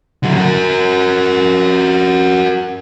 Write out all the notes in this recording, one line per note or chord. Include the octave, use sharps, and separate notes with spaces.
D3 F#3
F#4 A#4